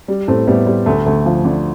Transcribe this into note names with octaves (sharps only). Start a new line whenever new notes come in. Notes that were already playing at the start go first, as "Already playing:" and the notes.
G3
A2 A3 C4
A2 G3 B3
G3
D2 A3
D2 A3
F3
D3